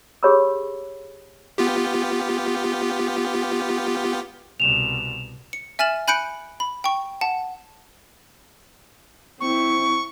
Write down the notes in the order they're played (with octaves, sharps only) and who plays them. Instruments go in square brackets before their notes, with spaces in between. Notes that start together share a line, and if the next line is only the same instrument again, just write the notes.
[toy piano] G4 G#4 C#5 B5 E6
[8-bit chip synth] B3 F4 G4
[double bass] C2 B2 [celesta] E7 F7
[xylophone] C#7
E5 G#5 F6 A6 E7 F#7
G#5 B5 F#6 G6 C#7 D7
B5
G5 C#6
F#5 A5
[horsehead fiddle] C4 E4 [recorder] C#6